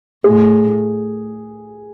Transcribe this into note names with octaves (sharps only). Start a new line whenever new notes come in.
A2 G#4